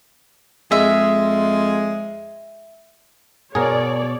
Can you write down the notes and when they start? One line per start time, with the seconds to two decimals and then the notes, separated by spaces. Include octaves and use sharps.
0.72 F2 G#3 E5
3.55 B2 G#4 A#4 C#5 D5